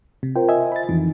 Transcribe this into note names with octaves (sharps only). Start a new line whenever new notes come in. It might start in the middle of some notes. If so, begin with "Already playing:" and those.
C3
F4 A#4 C5 G5
D#5 E5 G#5
B5 A6
F2 D#3 E3 D#4